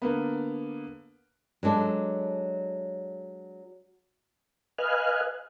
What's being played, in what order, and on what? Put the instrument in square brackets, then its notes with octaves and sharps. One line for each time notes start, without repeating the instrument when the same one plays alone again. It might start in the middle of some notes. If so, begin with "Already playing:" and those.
[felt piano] D3 A#3 B3
[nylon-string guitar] F#3 G#3 D4 A4
[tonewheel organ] B4 D#5 F5 G#5 F6 F#6